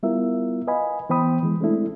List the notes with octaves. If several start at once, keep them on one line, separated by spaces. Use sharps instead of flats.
G3 B3 E4 F4 A#4 E5
B4 D#5 F5 G#5 B5
E3 B3 C5 G5 B5 D#6
E3 G#3
G#3 A3 C4 D4 E4 A4